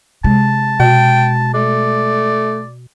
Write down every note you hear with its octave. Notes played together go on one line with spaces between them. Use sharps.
C3 G#3 A5
B2 G5
A3 D5